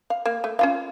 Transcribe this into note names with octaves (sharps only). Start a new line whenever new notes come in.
F5
A#3 F5
A3
C#4 F4 F5